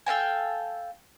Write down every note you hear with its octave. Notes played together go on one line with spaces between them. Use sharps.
A4 F5 G5 G#5